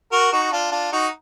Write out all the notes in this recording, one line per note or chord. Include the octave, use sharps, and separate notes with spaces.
F#4 A#4
D#4 F#4
D4 F4
D4 F4
D#4 F#4